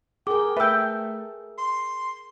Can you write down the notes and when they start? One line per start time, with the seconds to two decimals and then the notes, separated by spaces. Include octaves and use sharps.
0.27 G#4 A#4 G5 D6
0.57 A3 B4 E5 G5 E6
1.58 C6